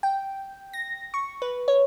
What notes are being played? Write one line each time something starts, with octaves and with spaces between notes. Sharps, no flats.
G5
A#6
C#6
B4
C#5